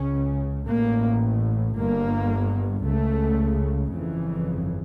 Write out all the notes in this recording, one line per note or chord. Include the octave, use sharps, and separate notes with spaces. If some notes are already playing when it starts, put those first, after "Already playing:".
Already playing: C#2 C#3 C#4
A1 A2 A#3
G1 G2 A#3
C#2 C#3 A3
G1 F2 C#3 E3